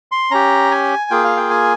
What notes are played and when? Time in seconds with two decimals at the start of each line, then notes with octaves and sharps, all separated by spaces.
0.12 C6
0.31 C#4 G4 A#5
0.71 G#5
1.10 A#3 F4 G#4 G5
1.24 F5
1.37 G5
1.50 G#5